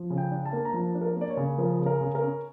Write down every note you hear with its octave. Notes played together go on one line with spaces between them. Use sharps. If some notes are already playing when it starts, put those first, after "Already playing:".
Already playing: F3
C#3
G5
D4
A5
A#3
A#5
F3 A5
D4
A#4
A#3
D5
C#5
C#3
F3 A#4
C#3
A#4
C#3
A#4
C#4